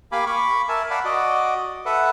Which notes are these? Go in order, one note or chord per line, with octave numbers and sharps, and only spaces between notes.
A#3 G4 F5 G#5 B5 D6
B5 C#6 D6
A#4 E5 G#5 A5
D5 F5 F#5 A5 B5
F#4 D5 D#5
A4 B4 E5 F#5